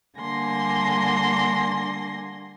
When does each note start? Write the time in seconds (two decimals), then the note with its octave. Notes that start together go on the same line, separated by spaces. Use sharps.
0.18 D3 G3 A#3 G#5 C6 A#6